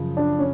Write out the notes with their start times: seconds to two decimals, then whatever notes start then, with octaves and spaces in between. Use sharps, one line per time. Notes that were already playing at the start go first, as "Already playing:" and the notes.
Already playing: F#2 C#3 F3
0.17 D4
0.39 C#4